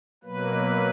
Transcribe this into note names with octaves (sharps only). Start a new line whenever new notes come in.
B2 F#3 A#3 B4